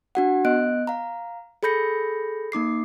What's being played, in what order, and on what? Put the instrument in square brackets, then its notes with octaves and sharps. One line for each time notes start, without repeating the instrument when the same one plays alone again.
[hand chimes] D4 F#4 F#5
B3 D#5 F#6 D7
F5 A#5
G#4 A4 B5 G6 A#6 C#7
A#3 D#4 D6 C7